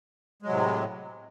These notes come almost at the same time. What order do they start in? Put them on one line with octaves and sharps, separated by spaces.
G#3 F#3 C3 A2